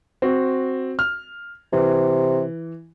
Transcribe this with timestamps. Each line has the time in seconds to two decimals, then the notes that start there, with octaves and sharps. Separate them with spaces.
0.22 C4 F#4
0.99 F6
1.73 C3 E3